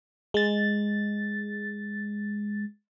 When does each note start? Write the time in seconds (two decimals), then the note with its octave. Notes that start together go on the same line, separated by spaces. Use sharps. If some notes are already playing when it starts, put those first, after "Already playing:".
0.34 G#3 A6